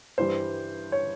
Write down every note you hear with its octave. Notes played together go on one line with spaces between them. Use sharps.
G2 E3 G3 C5
C#5